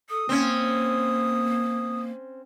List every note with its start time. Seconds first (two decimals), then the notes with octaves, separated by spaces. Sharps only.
0.10 A4 D#6
0.29 A#3 C4 C#4